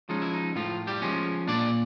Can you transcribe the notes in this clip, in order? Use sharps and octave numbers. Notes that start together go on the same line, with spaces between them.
F3 G#3 C#4 D#4
E4
D#4
A2 F3 F4
G3 G4
F3 G#3 C#4
A#2 D4 D5